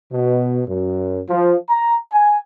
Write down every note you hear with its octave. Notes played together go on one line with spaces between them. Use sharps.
B2
F#2
F3
A#5
G#5